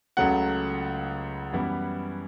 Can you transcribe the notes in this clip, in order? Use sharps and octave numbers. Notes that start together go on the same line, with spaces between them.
C#2 C#3 F#3 A3 F#5
F#2 E3 G3 B3 E4